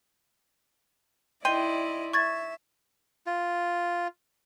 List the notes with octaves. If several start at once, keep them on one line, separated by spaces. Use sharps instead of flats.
D#3 E4 D5 D#5 G5 C6 D#7
E5 C#6 G#6 A6
F4